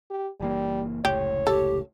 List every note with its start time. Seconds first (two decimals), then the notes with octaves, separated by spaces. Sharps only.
0.10 G4
0.40 F#1 E3 G3 A#3
1.05 F1 C#2 A2 G4 C#5
1.47 G4 A4